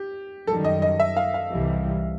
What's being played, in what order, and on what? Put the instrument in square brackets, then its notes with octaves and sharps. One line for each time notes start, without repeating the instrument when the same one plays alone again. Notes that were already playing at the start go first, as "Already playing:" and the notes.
Already playing: [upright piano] G4
[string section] F#2 D#3 G3 [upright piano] A4
[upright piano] D#5
D#5
E5
F5
F5
[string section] C2 C3 E3 G3